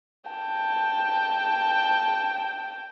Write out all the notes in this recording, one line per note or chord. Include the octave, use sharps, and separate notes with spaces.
G5 A5